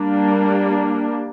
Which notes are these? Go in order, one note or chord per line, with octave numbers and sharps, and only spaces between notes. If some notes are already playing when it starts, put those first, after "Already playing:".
Already playing: G3 A#3 D4